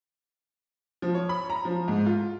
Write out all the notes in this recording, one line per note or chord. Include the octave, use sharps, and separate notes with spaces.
F3
C#5
B5
A#5
F3
G#2
F4